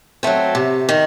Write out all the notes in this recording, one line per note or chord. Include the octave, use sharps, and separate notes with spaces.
F#3 A3 C4
C3
D#3